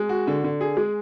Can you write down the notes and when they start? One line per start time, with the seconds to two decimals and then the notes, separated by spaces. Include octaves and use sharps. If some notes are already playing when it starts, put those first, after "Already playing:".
Already playing: G#3
0.09 F#4
0.27 D3
0.44 D3
0.61 G#4
0.77 G#3